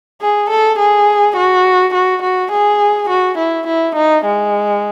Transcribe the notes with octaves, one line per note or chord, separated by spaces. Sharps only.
G#4
A4
G#4
F#4
F#4
F#4
G#4
F#4
E4
E4
D#4
G#3